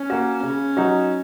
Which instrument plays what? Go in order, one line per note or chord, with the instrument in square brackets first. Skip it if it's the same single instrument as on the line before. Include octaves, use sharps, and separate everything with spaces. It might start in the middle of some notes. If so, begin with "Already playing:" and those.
Already playing: [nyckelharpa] C#4
[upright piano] A#3 F#4
[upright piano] C#3 [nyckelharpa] C#4
[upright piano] F#3 D#4 F#4